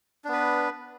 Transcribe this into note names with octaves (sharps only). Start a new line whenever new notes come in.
B3 D4 B4